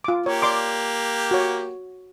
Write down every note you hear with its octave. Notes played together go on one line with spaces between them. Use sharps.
F4 D6
A#3 G4 C#5
D5 C6 D6
F#4 C#5